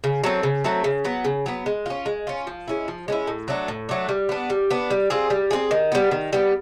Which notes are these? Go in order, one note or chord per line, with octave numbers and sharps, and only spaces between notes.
C#3
F#3 A3 C4
C#3
F#3 A3 C4
C#3
F#3 B3
C#3
F#3 B3
G#3
C#4 F4
G#3
C#4 F4
F3
G#3 C#4 E4
F3
G#3 C#4 E4
A2
F#3 A3 D4
A2
F#3 A3 D4
G3
B3 D4
G3
B3 D4
G3
C4 F4 G#4
G3
C4 F4 G#4
D#3
G3 B3
D#3
G3 B3